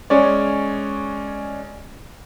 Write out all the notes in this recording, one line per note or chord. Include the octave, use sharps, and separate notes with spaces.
G#3 C#4 C#5 D5